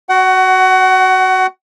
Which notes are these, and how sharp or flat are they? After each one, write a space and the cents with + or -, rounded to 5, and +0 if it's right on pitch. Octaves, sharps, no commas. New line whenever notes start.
F#4 +0 F#5 +25